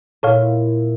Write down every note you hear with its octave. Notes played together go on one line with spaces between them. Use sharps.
A#2 E4 A4 C#5 F5